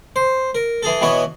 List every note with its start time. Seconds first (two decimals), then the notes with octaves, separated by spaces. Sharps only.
0.16 C5
0.55 A#4
0.83 E3 G#4 A4
1.01 B2 E3 B3 C#5 D#5